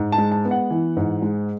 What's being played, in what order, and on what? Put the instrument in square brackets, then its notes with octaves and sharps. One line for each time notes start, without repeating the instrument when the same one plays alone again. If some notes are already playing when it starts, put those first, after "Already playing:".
Already playing: [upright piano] G#2
A5
G#3
A5
B3
F#5
E3
G#2
G#3